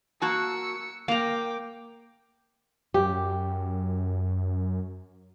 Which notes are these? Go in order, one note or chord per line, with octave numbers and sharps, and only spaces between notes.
A#3 F#4 A5 E6 C#7
A#3 F5 G5 A#5 D6
F#2 G4